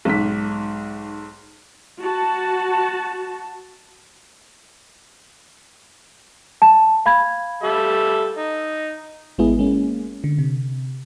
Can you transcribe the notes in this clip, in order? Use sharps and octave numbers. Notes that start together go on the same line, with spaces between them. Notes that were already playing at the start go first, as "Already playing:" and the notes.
B1 G#2 B6
F#4 A5
A5
F5 B5 G#6
G3 A4 E5
D#4
G#1 G#3 B3 E4 G#4
G#3 A#3 C#4
D3
C3